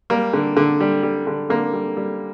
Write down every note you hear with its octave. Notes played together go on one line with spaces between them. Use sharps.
G3 A#3
D3
D3
G3
G3
D3
D3 A#3
G3
G3